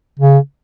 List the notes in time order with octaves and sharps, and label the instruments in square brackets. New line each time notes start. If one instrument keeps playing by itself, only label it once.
[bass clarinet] C#3